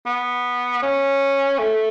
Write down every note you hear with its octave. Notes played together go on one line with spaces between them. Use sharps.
B3
C#4
A3